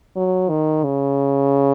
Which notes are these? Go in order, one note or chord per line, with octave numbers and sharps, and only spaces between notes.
F#3
D#3
C#3